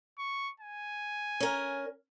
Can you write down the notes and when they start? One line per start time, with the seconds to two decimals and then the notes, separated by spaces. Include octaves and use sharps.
0.19 C#6
0.60 G#5
1.40 C#4 A#4